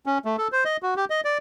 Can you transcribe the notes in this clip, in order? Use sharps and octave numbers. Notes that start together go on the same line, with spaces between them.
C#4
A3
A4
C5
D#5
F#4
G4
D#5
D5